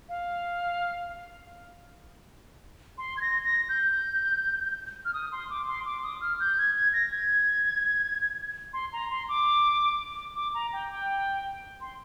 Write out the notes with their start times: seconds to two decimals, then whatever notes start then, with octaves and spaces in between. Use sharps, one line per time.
0.09 F5
2.98 C6
3.17 G#6
3.21 A#6
3.45 A#6
3.69 G6
5.05 F6
5.14 D#6
5.32 C6
5.50 D6
5.68 C6
5.85 D6
6.03 D#6
6.21 F6
6.40 G6
6.58 G#6
6.76 G#6
6.93 A#6
7.12 G#6
8.73 C6
8.93 A#5
9.11 C6
9.29 D6
10.36 D6
10.54 A#5
10.73 G5
10.90 G5
11.81 C6